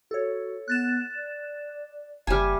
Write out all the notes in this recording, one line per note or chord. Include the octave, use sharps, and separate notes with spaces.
F#4 A4 C#5
B3 F#6 A6 E7
D5
F#1 G3 E5 G#5 A5 F6